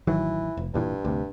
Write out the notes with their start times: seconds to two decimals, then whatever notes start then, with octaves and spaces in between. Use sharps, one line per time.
0.07 A1 D#3 E3 F#3
0.57 F1
0.74 E1 G2 A#2 E3
1.05 D2 C3